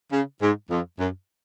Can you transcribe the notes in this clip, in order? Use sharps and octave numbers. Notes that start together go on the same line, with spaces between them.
C#3
G#2
F2
F#2